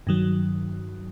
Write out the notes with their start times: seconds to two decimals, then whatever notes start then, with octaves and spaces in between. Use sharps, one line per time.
0.07 G2 D#3 F#3